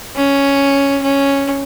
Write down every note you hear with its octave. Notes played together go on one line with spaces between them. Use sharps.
C#4
C#4